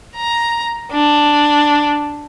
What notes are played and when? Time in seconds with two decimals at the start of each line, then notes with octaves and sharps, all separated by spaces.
0.16 A#5
0.92 D4